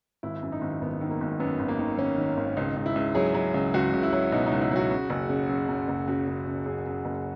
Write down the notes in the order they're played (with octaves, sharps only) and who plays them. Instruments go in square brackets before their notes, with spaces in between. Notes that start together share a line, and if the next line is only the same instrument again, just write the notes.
[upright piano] G#1 E4
F#2
D#4
G#1
G#1 B3
D#3
A#3
G#1
F#2 B3
G#1
A#3
D#3
D#3 C#4
D#3
G#1
C#2 D#4
C#2
E4
C#2
F#3 G#4
F#3
C#2
C#2 F#4
C#2
E4
F#3
B2 D#4
D#4
C#2
E4
F#3 F#4
C#3
F#1
C#3
F#2
F#2
F#1
C#3 F#4
C#3
C#3
F#2 G#4
F#2
F#1